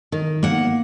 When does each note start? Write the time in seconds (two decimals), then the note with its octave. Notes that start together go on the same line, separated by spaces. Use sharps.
0.12 D#3
0.43 A#3 F#5